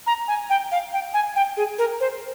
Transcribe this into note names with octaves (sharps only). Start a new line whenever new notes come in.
A#5
G#5
G5
F5
G5
G#5
G5
G#4
A#4
C5